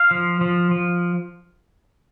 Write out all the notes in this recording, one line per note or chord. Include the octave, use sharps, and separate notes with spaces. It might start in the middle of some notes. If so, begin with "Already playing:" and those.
Already playing: F5
F3
F3
F3